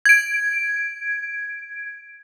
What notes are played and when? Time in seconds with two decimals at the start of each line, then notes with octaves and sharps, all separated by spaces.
0.05 G#6 D7